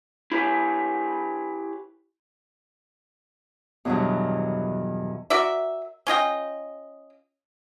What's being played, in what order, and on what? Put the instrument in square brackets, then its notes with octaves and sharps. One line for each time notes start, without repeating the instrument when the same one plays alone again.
[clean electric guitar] E4 G4 B4 C#5 G#5
[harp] E2 G2 B2 D#3 E3 F#3
[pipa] F#4 A#4 D5 E5
C#4 F4 D#5 G5